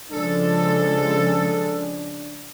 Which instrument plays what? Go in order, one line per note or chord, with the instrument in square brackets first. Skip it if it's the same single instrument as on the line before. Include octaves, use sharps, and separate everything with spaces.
[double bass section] C#3 F3 G#3 [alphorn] D4 [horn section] A4